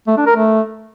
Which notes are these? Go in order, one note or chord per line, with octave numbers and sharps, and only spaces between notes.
A3
D4
A#4
A3